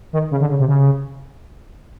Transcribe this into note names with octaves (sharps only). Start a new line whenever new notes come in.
D#3
C#3
D3
C#3
C3
C#3